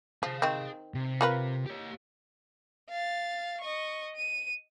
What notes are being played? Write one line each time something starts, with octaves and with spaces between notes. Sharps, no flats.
F3 G#4 F5
D#3 C4
C3
F4 A#4 B4
G4 C#5
F5 A6
D#5 C#6
D#7